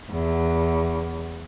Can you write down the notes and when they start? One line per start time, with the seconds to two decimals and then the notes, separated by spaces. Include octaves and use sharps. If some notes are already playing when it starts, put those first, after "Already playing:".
0.11 E2